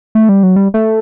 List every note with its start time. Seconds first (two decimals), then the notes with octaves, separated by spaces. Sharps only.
0.15 A3
0.29 G3
0.43 F#3
0.56 G3
0.74 A3